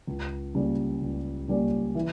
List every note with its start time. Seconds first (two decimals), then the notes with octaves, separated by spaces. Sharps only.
0.07 C#2
0.54 C#3 G3 A#3 C#4
1.01 C#2
1.48 C#3 G3 A#3 C#4
1.95 E3